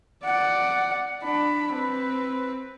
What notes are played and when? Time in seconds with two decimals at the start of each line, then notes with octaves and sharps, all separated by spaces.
0.25 D5 F#5
1.24 D4 B5
1.73 C4 B4